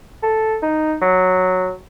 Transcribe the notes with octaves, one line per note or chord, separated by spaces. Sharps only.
A4
D#4
F#3